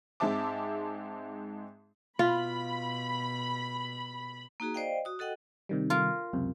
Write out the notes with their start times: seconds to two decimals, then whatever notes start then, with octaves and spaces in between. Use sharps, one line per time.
0.20 G#2 G#3 C4 E5 A5 D6
2.19 B2 F4 B5
4.60 A#3 D#4 F#4 G#4
4.74 C5 D5 D#5 F5 G5
5.05 F#4 D#6
5.19 F#4 A4 D#5 F#5 G5
5.69 C3 D#3 G3
5.90 F4 A#4
6.33 C#2 F#2 C3